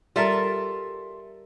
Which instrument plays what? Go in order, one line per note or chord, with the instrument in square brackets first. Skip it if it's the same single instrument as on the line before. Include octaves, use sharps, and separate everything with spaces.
[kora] G3 A#4 [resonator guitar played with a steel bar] F4 A4 E5